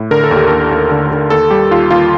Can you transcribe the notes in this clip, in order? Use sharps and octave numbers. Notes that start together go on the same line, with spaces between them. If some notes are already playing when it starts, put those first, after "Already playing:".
Already playing: A2
D3 A#4
A4
D#2
G4
D#2 A4
D#2
D3
D3
D#2 A4
G3 G4
D#2 F4
D#2 F4